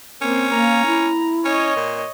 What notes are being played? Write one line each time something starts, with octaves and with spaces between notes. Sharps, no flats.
A#3 C4 C#4
A#3 A#5
E4
C#4 C#5 D#5
A#2